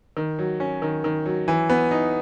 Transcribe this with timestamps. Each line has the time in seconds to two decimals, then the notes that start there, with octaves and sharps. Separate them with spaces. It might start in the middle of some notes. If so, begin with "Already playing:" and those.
0.17 D#3
0.39 F#3
0.60 C#4
0.82 D#3
1.04 D#3
1.26 F#3
1.48 E3
1.69 B3
1.91 D#4